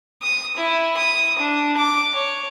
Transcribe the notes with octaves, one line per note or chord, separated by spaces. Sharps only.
D#6
E4
D#6
D4
D6
C#5